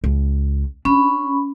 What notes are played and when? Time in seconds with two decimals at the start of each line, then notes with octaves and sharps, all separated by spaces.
0.04 C#2
0.85 C#4 D4 B5